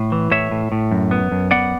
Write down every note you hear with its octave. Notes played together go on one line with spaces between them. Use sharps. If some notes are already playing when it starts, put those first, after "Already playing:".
Already playing: A2
E3
A2 C#5 E5
A2
A2
F#2
B3
F#2
B3 D5 F#5